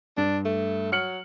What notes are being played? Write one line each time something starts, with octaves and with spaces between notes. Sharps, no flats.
G2 D4
A3
F#3 F6 C#7 F#7